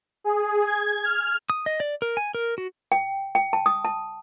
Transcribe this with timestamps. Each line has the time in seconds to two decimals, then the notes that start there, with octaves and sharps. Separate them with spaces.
0.24 G#4
0.66 G#6
1.04 F6
1.50 D#6
1.66 D#5
1.80 D5
2.02 A#4
2.17 G#5
2.35 A#4
2.58 F#4
2.92 G5
3.35 G5
3.53 A5
3.66 D#6
3.85 A5